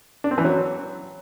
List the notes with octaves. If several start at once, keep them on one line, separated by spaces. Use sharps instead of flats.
D4
C4
E3
F#3